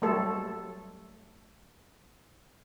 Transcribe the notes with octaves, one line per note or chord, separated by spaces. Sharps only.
F#3 G3 A3 A4